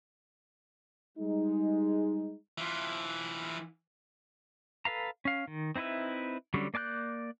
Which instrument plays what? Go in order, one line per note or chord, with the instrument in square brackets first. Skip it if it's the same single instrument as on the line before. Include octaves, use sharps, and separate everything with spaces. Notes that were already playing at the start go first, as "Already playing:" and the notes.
[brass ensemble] G3 G#3 D#4
[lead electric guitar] E3 F4
[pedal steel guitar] A4 B4 F5 A#5
C#4 F5
D#3
C4 D#4 E4 B4 E5
D3 F#3 G3 C#4
A#3 D5 A5 F#6 G6